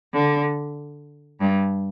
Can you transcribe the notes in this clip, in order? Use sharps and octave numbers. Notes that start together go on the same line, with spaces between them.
D3
G2